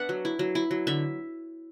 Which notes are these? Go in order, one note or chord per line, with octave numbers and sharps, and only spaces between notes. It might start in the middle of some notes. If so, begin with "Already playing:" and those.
Already playing: B3 D4 E5 F#5
F#3
E4
F#3
E4
F#3
D3 E5